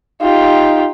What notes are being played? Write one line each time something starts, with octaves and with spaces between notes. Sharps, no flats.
D#4 F4 G4